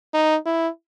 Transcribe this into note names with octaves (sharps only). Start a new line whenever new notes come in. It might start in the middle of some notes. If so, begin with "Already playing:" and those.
D#4
E4